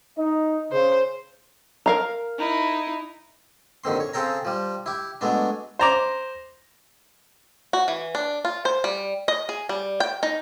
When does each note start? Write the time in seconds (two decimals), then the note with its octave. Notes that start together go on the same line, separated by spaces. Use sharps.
0.17 D#4 D#5
0.72 C#3 C5
1.86 A#4 F5 A#5
2.38 D#4 E4
3.84 A#1 D3 D#3 C4 C6
4.00 C#5
4.14 C#3 C4 G#4 A4 G5 A#5
4.45 F3 G3
4.86 E4 G4
5.21 F#3 G#3 A3 B3 D4
5.79 C5 A#5 D6
7.73 F#4
7.88 E3
8.15 D4
8.45 F4
8.65 C5
8.84 G3
9.28 D#5
9.49 G#4
9.69 G3
10.00 G5
10.23 D#4